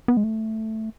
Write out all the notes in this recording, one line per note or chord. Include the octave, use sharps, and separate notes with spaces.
B3
G#3
A3